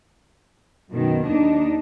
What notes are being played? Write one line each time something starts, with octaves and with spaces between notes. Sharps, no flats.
F#2 B2 D#3
D#2 D4 D#4